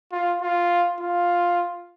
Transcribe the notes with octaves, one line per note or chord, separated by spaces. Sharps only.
F4
F4
F4